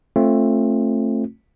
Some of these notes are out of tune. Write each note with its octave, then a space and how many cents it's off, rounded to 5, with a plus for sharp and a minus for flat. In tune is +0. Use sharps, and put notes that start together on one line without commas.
A3 +0 C4 +30 F4 +0